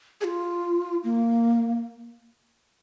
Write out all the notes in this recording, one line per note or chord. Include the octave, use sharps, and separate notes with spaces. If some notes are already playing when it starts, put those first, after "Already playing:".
G#4
F4
A#3